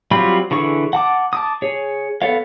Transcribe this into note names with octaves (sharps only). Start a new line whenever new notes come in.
F#3 G3 C4 F4 B5
D3 E3 G#4 C#6
F#5 A5 D6
A5 D6 D#6
G#4 C#5
B3 A4 C#5 F5